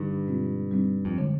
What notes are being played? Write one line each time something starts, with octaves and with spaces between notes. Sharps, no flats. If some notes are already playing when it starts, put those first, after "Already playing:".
Already playing: G2 D3 D#4
B2 G#3 C4 F4
G3 C4 D#4
F2
D3 G#3